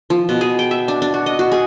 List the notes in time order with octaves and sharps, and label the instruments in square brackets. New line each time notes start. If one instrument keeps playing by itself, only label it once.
[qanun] F3
B2
G#4
G5
E5
D4
D4
F#4
D#5
F#4
G#4